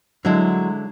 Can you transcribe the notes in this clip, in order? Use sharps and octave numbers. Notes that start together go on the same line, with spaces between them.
D3 F#3 G#3 E4